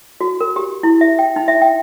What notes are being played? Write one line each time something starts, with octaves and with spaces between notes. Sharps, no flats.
F#4
A#4
G4
E4
E5
G5
D#4
E5
G5